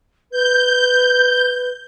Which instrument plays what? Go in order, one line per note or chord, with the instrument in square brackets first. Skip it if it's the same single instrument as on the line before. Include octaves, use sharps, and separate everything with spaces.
[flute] B4 [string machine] G6